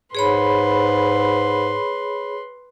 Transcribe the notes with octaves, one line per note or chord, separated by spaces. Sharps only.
G#2 G#4 B4 C#5 B5 C6